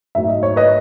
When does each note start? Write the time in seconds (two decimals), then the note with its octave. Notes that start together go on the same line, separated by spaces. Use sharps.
0.15 G#2 F#3 A3 E4 E5
0.28 D#5
0.43 C#5
0.56 B4 D#5